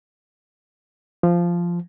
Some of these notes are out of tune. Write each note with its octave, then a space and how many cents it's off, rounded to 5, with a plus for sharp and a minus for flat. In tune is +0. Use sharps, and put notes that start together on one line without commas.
F3 -10